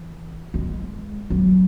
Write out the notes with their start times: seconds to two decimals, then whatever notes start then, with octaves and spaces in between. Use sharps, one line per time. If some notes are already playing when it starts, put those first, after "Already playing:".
Already playing: E3
0.54 G#3
1.30 F#3